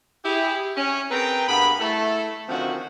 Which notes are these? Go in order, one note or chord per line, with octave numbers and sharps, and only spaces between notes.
E4 G4 G#4
C#4
C4 G#4 A#4 B4 G5 A#5
G2 A#3 B3 G#4 B5
A3 E4 A4
D3 D#3 F3 C4 C#4 F#4